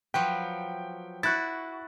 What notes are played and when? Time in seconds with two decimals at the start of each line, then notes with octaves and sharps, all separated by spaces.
0.14 F3 F#3 B4 G5
1.23 E4 F#4 F#6 A6